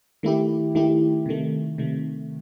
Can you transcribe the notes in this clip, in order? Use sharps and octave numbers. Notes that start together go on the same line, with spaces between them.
D#3 A3 E4 G4
D#3 A3 E4 G4
C3 D#3 A3
C3 D#3 A3